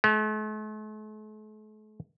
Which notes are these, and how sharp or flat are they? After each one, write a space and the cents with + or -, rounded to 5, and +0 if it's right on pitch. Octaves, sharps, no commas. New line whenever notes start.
A3 -45